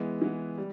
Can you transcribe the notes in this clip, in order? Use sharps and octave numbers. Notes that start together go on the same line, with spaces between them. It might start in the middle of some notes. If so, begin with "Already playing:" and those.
Already playing: E3 G#3 B3
E3 G#3 B3
G3